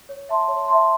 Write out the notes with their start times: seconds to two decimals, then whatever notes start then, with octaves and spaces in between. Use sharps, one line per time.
0.09 C#5
0.29 E5 A5 C6
0.48 C#5
0.68 E5 A5 C6